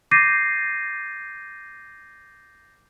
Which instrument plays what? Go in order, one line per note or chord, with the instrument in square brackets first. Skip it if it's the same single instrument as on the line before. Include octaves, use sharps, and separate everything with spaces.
[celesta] D6 G6 A6 A#6 C7 D#7